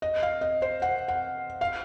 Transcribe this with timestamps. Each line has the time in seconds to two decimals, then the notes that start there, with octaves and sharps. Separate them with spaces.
0.02 D#5
0.23 F5
0.41 D#5
0.62 C5
0.82 F#5
1.08 F#5
1.61 F5